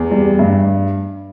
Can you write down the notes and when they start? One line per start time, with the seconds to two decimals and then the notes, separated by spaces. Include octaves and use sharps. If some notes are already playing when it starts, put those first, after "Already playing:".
Already playing: E2
0.11 G3
0.39 G2